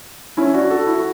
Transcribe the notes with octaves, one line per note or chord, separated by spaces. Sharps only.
C#4 E4
D4 F#4
F#4 A4
E4
F#4